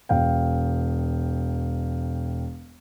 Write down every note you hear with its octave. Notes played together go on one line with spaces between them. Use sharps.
E1 F5 G5